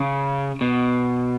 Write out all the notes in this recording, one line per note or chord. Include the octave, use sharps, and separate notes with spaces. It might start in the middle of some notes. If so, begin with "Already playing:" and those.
Already playing: C#3
B2